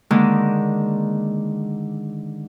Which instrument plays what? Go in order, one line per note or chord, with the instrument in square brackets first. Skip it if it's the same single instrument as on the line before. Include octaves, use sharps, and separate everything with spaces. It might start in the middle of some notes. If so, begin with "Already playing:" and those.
[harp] D3 D#3 G#3 A#3